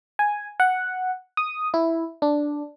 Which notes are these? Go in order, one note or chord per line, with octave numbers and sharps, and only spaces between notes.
G#5
F#5
D#6
E4
D4